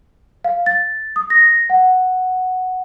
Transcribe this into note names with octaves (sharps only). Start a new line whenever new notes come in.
F5
A6
D#6
A#6
F#5